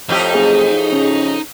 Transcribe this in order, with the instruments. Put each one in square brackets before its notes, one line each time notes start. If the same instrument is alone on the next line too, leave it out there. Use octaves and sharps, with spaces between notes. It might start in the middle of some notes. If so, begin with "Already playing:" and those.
[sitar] F2 A2 G4 [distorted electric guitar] D#4
[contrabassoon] F#1 [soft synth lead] G#4
[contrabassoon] C#3